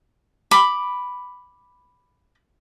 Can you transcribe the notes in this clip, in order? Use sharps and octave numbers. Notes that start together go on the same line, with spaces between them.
B5 D6